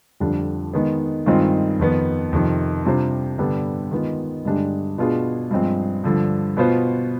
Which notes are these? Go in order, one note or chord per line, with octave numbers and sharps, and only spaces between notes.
F2 D3 G3 D4 F4
D#3 G#3 B3
G2 D#3 G#3 C4 F4
F2 D#3 B3
F2 C3 D#3
C3 G3 D4 F4 C5
G2 D3 G3 B3 D4
D#3 G#3 B3 F4
G2 D3 G#3 D4 G4
B2 B3 D4 F4 G#4
G2 F3 G#3 C4
G2 D3 F3
B2 B3 F4 C5